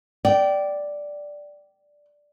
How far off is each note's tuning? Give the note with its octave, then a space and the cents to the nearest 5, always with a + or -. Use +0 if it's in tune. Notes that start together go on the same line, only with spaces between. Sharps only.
D5 +0 G5 -20